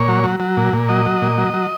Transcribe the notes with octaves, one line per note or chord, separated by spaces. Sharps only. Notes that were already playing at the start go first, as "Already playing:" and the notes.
Already playing: A#2 C#5
F#3
F#3
F#3
A#2
A#2
F#3 D#5
F#3
A#2
F#3
F#3